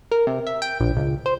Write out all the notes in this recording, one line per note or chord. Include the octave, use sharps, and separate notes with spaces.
A#4
C3
E5
G5
A#1
C#2
C5